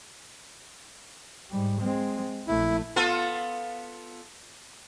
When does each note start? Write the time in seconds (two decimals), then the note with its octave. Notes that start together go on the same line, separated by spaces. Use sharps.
1.51 G#2 G3
1.81 G#3 C4
2.48 A#1 A3 E4
2.96 B3 F4 A4